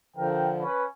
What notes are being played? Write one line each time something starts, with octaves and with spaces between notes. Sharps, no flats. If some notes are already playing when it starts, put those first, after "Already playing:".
D3 F3 A#4 G5
C#4 B4